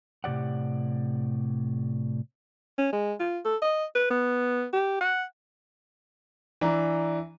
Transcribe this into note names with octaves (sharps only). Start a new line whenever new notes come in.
A2 C3 G4 D5 F#5
C#4
G#3
F4
A4
D#5
B4
B3
G4
F#5
E3 D4 A#5